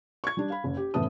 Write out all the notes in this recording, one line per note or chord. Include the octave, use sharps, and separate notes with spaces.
C#6 G#6
G3 D4
F5 B5
F#1
G4
F#1 A2 E3 B3 A5 D#6